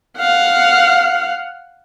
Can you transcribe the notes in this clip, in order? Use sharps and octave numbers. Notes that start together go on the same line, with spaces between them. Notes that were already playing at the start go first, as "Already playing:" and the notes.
F5 F#5